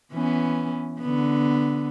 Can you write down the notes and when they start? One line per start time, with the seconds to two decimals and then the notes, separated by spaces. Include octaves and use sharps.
0.13 E3 B3 C#4
1.00 D3 B3